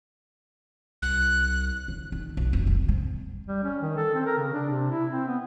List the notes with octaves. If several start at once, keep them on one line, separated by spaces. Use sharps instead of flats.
C2 F#6
C#3
D#3
B1
F1
D#2
C3
G3
C#4
D#3
A4
C4
A#4
C#3
D4
C3
E4
C4
B3